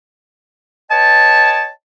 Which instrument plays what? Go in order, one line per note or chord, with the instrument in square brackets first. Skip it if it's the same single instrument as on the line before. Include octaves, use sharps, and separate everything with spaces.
[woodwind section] B4 C#5 D#5 G5 A5